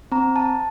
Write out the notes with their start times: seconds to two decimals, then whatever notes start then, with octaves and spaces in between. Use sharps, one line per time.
0.12 C4 A#5
0.36 A5